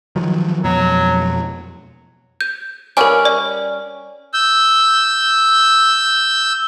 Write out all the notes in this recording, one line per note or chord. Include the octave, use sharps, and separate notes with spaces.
D#3 F3 F#3
F2 B2 F#3
G6
G3 C#4 A#4 G#5
D5
E6 G6